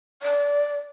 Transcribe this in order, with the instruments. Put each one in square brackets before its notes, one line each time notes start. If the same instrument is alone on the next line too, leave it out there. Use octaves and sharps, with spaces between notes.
[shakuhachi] D5